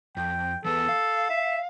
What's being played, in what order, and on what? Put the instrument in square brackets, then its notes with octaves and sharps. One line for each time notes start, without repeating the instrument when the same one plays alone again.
[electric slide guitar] F2 [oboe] G5
[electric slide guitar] E3 B3 B4 [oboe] A4
[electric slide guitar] F5
[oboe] E5